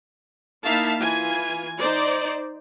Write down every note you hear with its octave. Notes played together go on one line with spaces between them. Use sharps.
A#3 D#4 E4 E5 F5 A5
E3 F4 G#5
D#4 C5 D5